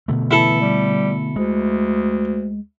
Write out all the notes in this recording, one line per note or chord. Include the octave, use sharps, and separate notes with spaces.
B2 D3 A3
E3 E4 A4
G3
D2 G#3